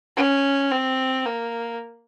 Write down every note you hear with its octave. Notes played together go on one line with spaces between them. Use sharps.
C#4
C4
A#3